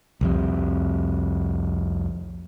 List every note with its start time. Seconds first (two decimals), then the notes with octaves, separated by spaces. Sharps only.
0.21 C2 F2 C3